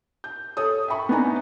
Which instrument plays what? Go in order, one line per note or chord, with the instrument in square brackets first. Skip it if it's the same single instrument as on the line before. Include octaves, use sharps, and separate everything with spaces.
[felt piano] G6
A4 C#5 D#6
E5 G5 B5 C#6
B3 D4 D#4 G#5 A#5